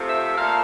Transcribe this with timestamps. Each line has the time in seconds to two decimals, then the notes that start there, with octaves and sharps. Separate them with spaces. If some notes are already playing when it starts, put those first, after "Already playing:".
Already playing: C3 F3 A3
0.09 E5
0.37 A#2 F3 A3 F5